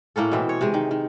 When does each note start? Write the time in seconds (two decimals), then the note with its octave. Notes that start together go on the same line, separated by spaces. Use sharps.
0.16 A2 A#3 C#4 A4
0.31 B2 E3 C4
0.49 C#5
0.61 C3 G#3
0.74 D#3
0.91 D#3